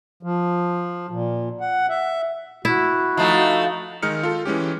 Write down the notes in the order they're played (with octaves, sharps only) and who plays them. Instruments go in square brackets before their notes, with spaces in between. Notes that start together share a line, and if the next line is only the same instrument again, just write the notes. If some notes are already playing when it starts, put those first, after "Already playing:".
[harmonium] F3
A#2
F#5
E5
[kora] E4 [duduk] F#4
[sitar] F3 A3 [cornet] D#4
[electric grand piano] D#3 G#3 D#4 F6 C#7
F4 A4
E3 G#3 C#4 G4